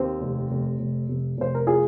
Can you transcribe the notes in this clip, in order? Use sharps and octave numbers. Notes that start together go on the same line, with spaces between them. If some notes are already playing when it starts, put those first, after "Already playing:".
Already playing: D#2 C4
F1
F1
F1
F1
F1 C5
A#4
F4 G#4